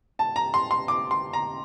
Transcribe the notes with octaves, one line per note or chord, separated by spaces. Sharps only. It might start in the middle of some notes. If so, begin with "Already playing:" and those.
A5
A#5
C6
C6
D6
C6
A#5